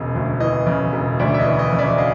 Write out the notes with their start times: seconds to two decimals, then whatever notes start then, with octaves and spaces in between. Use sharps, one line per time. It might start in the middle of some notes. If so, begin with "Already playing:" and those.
Already playing: E1 C#3 D#5
0.15 D2
0.40 E3 D#5
0.67 C#3
0.93 E1
1.19 D2 D5 E5
1.34 E5
1.40 D#5
1.46 E3
1.59 D#5
1.72 C#3
1.78 D5 E5
1.98 D#5 F5